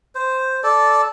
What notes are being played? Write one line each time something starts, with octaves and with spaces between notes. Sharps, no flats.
C5
A4 D5